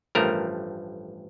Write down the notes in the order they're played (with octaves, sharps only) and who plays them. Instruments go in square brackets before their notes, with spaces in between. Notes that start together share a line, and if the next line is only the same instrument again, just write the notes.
[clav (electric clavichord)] A1 G2 F3 A3 A#4